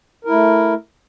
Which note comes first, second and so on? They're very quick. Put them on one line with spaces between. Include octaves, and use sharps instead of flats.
A#4 E4 A3